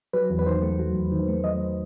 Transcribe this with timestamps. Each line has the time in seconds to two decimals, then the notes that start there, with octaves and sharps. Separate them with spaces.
0.13 F#3 B4
0.30 E2
0.39 B4
0.46 D#3 C5
0.63 A3
0.79 F#3
0.95 E2
1.12 D#3
1.28 A3
1.44 F#3 D#5